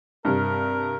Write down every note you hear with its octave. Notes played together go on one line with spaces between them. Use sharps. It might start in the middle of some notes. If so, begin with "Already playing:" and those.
G2 C3 A#4